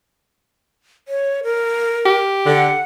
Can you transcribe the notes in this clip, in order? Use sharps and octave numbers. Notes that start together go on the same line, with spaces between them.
C#5
A#4
G4
D3 F#5